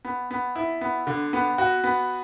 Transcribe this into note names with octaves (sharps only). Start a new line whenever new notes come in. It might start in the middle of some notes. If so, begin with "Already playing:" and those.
B3
B3
E4
B3
D3
B3
F#4
B3